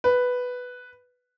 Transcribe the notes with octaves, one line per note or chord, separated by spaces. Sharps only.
B4